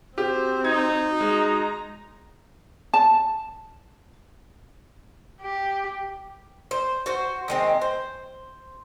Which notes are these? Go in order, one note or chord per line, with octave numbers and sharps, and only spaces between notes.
C4 F#4 G4 C5
D#4 G#6
G#3 A#5
A5
G4
C5
F#4 C5
D#3 G#3 C4
C5